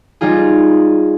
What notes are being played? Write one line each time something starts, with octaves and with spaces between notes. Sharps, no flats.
G3 D#4 F4 G#4